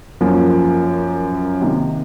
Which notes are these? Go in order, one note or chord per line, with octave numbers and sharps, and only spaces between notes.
F#2 F3 A#3
C3 D#3 A#3